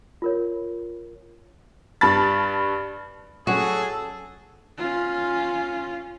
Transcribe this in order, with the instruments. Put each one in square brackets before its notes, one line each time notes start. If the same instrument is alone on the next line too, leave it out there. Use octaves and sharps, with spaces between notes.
[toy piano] F4 A#4 C#5
[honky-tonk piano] G2 A5 B5 A6
[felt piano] F#3 C#4 [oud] F#4 [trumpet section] G#4 [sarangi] A4
[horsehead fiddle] C#4 F4